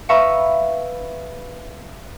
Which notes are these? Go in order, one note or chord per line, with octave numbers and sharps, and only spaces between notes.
B4 E5 F5 A#5 B5 C#6